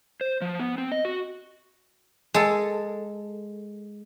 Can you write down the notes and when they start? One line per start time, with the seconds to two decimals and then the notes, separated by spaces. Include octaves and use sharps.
0.21 C5
0.42 F3
0.60 B3
0.78 C4
0.92 D#5
1.05 F#4
2.34 G#3 A4